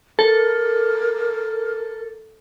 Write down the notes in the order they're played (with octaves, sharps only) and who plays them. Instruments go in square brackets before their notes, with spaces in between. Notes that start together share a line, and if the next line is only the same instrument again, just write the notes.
[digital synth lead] A4 [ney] A#4